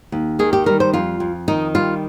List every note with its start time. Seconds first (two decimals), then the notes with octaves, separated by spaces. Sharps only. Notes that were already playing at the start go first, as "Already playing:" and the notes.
0.12 D#2
0.39 D#3 G#4
0.53 G4
0.66 G3 A#4
0.80 C5
0.94 F2 F4
1.20 F2
1.48 D#3 D#4
1.75 G3 F4